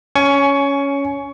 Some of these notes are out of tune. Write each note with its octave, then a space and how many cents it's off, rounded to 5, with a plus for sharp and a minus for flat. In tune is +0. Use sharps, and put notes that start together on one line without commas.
C#4 +10 G#5 +25 C#6 +15